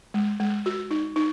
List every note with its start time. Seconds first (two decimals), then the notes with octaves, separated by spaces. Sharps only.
0.14 G#3
0.40 G#3
0.66 F#4
0.91 D#4
1.16 D#4